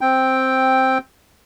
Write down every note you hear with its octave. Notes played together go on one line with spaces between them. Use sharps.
C4 G5